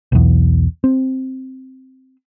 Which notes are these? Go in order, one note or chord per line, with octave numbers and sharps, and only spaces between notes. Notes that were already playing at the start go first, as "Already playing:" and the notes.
B1 E2
C4